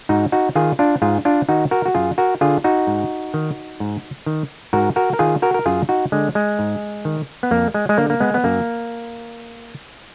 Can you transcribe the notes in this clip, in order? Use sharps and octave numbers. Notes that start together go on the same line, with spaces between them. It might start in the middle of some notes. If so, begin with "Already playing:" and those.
G#2 D#4 F#4
D#4 F#4
D#3 F4 G#4
D4 F4
G#2 F4 G#4
D4 F4
D#3 D#4 F#4
F#4 A#4
F#4
F#2 F4 G#4
F#4 A#4
D3 F4 G#4
D#4 F#4
G#2
D#3
G#2
D#3
G#2 F#4 A#4
F#4 A#4
A#4
D#3 F4 G#4
F#4 A#4
A#4
F#2 F4 G#4
D#4 F#4
D3 G#3
G#3
G#2
D#3
B3
F2 A#3
G#3
G#3
D3 A#3
A#3
G#3 B3
B3
F#2 A#3